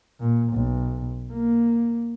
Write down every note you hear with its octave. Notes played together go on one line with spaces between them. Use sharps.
A#2
B1
A#3